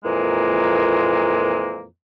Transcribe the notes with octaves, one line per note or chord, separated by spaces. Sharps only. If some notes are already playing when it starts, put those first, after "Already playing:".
F2 A#2 E3 G#3 A#3